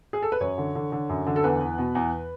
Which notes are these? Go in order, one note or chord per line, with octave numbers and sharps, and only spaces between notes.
G#4
A4
B4
F#2 C#5
D3
D3
D3
F#2
D3
A4
E2 B4
E2
B2
E2